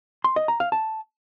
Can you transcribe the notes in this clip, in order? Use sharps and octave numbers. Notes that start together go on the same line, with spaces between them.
C6
D#5
A#5
F5
A5